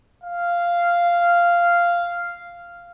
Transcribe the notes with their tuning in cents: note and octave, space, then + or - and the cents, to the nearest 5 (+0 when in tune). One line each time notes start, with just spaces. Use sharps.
F5 -5